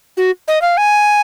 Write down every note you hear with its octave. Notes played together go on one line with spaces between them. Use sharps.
F#4
D#5
F5
G#5